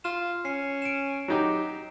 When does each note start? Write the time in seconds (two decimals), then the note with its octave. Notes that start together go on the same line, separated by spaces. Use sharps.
0.04 F4 E7
0.45 C#4 C7
0.82 D7 E7
1.28 F#3 D#4 G4